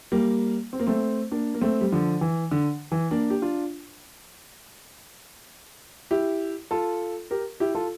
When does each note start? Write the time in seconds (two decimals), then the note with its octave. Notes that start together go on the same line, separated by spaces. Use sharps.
0.12 G3 A#3
0.73 C4
0.80 A#3
0.87 A3 C4
1.32 A#3 D4
1.54 A#3
1.61 A3 C4
1.81 G3
1.92 D3 F3
2.21 E3
2.51 D3
2.92 E3
3.11 A#3 D4
3.30 G4
3.42 D4 F4
6.11 E4 G4
6.71 F4 A4
7.31 G4 A#4
7.60 E4 G4
7.75 F4 A4